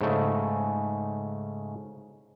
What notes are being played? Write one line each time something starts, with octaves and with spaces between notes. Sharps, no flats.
G#2 C#3 A3